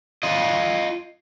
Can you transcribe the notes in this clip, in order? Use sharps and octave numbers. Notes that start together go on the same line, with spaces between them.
F4 D#5